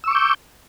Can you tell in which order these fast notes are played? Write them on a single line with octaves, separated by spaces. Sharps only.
E6 C#6 D6 G6